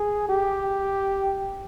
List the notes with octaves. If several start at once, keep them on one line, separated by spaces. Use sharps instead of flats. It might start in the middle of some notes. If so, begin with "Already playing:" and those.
Already playing: G#4
G4